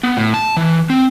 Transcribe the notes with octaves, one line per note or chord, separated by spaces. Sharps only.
B3
A2
A5
E3
C4